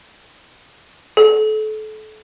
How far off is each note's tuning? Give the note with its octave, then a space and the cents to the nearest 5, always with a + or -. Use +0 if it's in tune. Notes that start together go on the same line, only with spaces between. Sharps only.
A4 -30